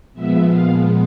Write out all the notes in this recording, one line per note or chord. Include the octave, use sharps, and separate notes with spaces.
A#2 F3 G#3 B3 E5
F5